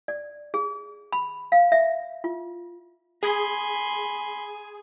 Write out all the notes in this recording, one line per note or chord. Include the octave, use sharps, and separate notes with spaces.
D5
G#4
B5
F5
E5
F4
G#4 G#5 B5 C6